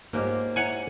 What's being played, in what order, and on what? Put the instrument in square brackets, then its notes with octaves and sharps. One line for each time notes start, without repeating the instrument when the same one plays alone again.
[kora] G#2 F4 G4 [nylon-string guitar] A#3 [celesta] C#5 D#5
[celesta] E4 E5 A#5 [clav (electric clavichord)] C#5 F#5 G#5